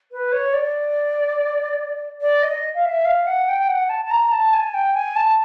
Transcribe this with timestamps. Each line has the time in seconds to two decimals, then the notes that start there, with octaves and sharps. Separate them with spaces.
0.11 B4
0.32 C#5
0.53 D5
2.20 D5
2.42 D#5
2.74 F5
2.84 E5
3.04 F5
3.26 F#5
3.48 G5
3.68 F#5
3.89 A5
4.04 A5
4.10 A#5
4.31 A5
4.53 G#5
4.73 G5
4.94 G#5
5.15 A5